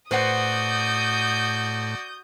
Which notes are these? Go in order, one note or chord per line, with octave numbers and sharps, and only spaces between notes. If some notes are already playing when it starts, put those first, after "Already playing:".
A2 F#4 B4 C5 D5 F#5 D#6 G6